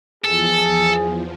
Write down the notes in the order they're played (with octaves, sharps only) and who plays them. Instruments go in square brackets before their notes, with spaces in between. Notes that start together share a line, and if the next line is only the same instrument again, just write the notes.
[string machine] E2 F3 [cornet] G#4 [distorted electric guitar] A4